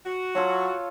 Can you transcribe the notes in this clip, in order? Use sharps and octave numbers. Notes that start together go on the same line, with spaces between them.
F#4
F#3 F4 A4 C#5